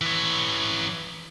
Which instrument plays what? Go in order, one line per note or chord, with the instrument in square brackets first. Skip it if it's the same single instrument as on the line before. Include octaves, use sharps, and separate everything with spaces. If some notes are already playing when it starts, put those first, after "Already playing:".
[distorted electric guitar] E3 C#5